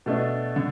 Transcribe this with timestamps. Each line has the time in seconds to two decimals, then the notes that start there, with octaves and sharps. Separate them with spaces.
0.06 B2 A3 D4
0.56 D3